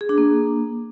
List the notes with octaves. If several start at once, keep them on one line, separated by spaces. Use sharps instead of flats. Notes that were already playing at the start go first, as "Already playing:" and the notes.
G#4
D4
A#3